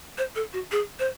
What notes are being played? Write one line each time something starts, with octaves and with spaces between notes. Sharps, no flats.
C5
A4
F#4
G#4
C5